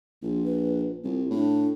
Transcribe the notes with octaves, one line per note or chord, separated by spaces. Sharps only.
A#1 F4
B4
C2 F4
A2 D4